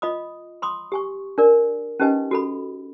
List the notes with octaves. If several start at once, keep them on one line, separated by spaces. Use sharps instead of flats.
F4 D#5 B5 D#6
B5 C6 D#6
G4 G#5 C#6
D4 A#4 D5
C#4 D#4 G4 B4 D#5 G#5
F#4 A4 B5